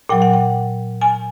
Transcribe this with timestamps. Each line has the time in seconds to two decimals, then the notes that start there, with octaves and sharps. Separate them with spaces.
0.09 A#2 F#3 G5
0.22 F#5
0.33 G5
1.02 G#5